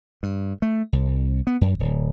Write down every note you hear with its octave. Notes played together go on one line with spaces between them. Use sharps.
G2
A3
C2
B3
F#2
D1